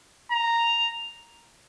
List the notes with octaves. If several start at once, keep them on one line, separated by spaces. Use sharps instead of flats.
A#5